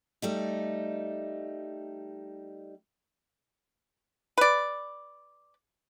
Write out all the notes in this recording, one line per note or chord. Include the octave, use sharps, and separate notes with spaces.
G3 A3 D#4
B4 D5